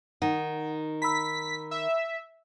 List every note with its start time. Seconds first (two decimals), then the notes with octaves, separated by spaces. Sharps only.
0.22 D#3 D#4 F#5
1.02 A#5 B5 E6 B6
1.71 E5